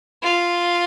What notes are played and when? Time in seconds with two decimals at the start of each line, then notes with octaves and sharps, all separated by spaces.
0.23 F4